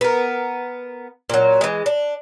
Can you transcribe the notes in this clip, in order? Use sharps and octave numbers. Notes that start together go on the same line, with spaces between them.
B3 A#4
A#2 F#3
E3 G#3
D4